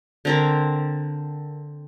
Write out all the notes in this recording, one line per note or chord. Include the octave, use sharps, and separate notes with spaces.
D3 C4 A#4